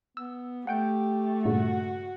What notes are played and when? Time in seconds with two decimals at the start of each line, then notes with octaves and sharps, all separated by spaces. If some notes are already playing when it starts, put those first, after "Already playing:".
0.17 B3 E6
0.67 A3 G4 F#5 G5 G6
1.45 G2 A#2 C#3 F#4